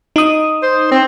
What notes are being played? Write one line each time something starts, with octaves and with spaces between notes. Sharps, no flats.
D#4 D#6
C5
C4